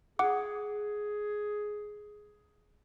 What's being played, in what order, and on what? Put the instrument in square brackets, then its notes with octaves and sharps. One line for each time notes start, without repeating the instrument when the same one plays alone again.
[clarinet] G#4 [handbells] F#5 D6